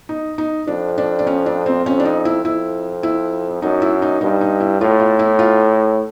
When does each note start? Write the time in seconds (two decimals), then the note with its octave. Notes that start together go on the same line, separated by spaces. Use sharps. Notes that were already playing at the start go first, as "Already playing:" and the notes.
0.09 D#4
0.38 D#4
0.67 F2 D4
0.98 D4
1.19 D4
1.27 C#4
1.46 D4
1.66 C4
1.86 F2 C#4
2.00 D4
2.05 D#4
2.25 E4
2.44 F2 E4
3.03 E4
3.62 F#2 D#4
3.82 E4
4.02 D#4
4.21 G2 D#4
4.41 D#4
4.60 E4
4.81 A2 F4
5.00 F4
5.19 E4
5.39 F4